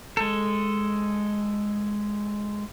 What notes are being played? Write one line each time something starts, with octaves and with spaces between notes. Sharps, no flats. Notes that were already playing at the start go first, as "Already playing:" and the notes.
G#3 A4